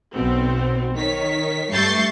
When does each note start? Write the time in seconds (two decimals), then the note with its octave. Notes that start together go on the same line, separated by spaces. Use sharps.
0.13 B1 B2 C4
0.95 D#3 C#5 B6
1.73 G2 A3 C#6 G6 A6 C7